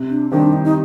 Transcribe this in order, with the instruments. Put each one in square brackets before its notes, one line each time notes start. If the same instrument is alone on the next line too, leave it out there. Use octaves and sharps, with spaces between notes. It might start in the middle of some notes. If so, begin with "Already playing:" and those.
Already playing: [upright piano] C3
[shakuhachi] D4
[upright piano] D#3 G3 C4 G4 [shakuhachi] D4
[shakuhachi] D#4
D#4